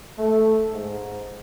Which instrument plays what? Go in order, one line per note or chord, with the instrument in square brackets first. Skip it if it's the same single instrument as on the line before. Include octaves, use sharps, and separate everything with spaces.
[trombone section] A3
G#2